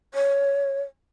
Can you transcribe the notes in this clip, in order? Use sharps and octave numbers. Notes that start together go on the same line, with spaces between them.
C#5